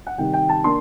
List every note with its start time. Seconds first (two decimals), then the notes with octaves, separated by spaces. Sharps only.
0.06 F#5
0.18 C3 D#3 G3 G5
0.33 G5
0.49 A5
0.64 A#3 D4 C6